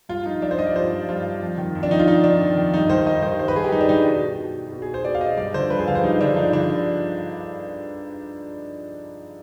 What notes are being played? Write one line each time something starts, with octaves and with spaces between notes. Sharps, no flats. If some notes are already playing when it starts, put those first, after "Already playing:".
G2 F4
F3 D#4
G2 D4
C5
F3 D#5
D5
G2 C5
F3
G2 F4
F3
F2
D#3
F2
D4
D#3 D#4
F4
F2 D#4
D#3 D4
F2
D#3
G2 D#4
D#3 C5
G2 D#5
D#3 C5
G2 C5
B4
D#3 G#4
G4
G2 D#4
D4
D#3 D#4
B2
B2
B2
G#4
C5
B2 D5
F5
D#5
G2 D5
D3 F3 C5
G2 B4
G#4
D3 F3 C5 F5
G2 D#4
D3 F3 D4
G2 D#4
D3 F3 D4